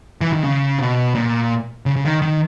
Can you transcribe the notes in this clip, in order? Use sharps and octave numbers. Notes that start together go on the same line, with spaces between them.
E3
D#3
C#3
B2
A#2
C#3
C#3
D#3
D#3